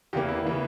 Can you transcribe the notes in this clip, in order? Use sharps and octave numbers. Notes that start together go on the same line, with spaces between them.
E2 C#3 E3 A#3 G4
E4
C#3 E3 A#3